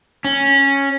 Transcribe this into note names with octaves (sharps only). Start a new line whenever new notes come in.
C#4